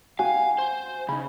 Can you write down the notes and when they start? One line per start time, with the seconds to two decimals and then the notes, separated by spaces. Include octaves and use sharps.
0.19 F#4 F5 G5 G#5
0.58 C5
1.09 C#3 D#4 B5